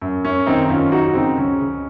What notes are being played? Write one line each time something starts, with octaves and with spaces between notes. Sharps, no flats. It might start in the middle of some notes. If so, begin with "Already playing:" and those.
F#2
F#2 C#4
D#3 C4 D#4
D#4
F#2 C#4 F4
F#2 D#4 F#4
C#3 C4 D#4
C#2 C#4
C#2